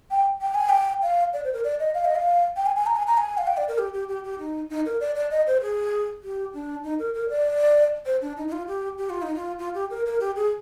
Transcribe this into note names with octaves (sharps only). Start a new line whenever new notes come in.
G5
G5
G#5
G5
F5
D5
C5
A#4
D5
D#5
F5
D#5
F5
G5
G#5
G#5
A#5
G#5
A#5
G#5
F5
G5
D5
A#4
G4
G4
G4
G4
D#4
D#4
A#4
D5
D5
D#5
C5
G#4
G4
D4
D#4
A#4
A#4
D5
C5
D4
D#4
D#4
F4
G4
G4
F4
D#4
F4
F4
G4
A#4
A#4
G4
G#4